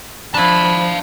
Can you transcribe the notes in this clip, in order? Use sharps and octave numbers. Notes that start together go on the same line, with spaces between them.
F3 D4 E4 F5 A5 B5